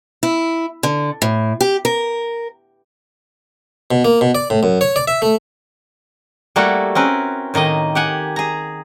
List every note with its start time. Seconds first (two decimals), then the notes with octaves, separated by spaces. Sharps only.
0.23 E4
0.83 D3
1.22 A2
1.61 G4
1.85 A#4
3.91 B2
4.05 A#3
4.21 B2
4.35 D5
4.50 A2
4.63 F#2
4.81 C#5
4.96 D5
5.08 E5
5.22 A3
6.56 G3 A3 A#3 E4 F#4 A4
6.95 C4 C#4 A#4 B4
7.54 A2 D#3 A#3 D#5
7.95 G4 F#5 G#5
8.36 G#4 A#5